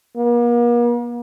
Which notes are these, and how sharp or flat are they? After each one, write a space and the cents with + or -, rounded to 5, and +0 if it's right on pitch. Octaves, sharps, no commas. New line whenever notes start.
A#3 +40